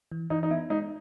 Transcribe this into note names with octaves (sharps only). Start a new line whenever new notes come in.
E3
E3 D#4
D#4
B3 E4
G#3 D#4